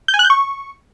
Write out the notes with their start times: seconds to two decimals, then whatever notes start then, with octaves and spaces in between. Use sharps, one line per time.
0.08 G6
0.14 G#5
0.19 F#6
0.25 G6
0.30 C#6